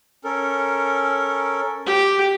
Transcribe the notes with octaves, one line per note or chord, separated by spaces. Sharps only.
C#4 A4 A#4
G4